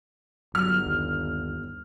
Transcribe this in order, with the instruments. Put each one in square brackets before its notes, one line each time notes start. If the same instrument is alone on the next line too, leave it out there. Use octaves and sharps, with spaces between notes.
[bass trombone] G1 [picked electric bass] F#3 [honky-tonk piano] F6
[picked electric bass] D#2